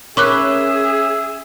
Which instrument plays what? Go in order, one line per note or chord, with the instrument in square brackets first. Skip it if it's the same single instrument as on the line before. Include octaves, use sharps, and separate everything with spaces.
[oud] C#4 A#4 B4 [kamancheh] G#4 [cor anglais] E5 [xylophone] C#6 D6 F#6